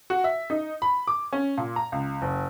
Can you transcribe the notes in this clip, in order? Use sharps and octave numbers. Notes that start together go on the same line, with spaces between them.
F#4
E5
D#4
B5
D6
C#4
A#2
A#5
C#2
F#1